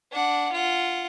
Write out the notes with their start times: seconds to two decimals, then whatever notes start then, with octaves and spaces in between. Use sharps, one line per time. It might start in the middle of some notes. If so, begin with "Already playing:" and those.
0.12 D4 F#5
0.52 F4 F#5